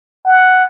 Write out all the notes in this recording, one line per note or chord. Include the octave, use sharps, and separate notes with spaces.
F#5